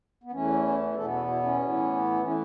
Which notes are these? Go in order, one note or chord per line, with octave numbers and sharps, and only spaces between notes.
B3
E2 E3 A3 C#4
E2 B2 B3 A4
F#4
E4
C#4
A2 E3 B3
E4
E3 A3 C#4